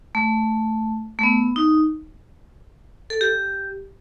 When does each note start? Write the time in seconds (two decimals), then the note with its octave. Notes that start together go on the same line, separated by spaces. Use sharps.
0.15 A3
1.19 A3
1.23 B3
1.56 D#4
3.10 A4
3.21 G4